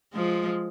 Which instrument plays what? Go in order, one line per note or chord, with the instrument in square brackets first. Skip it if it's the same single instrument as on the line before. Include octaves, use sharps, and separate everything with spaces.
[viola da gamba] F3 G#3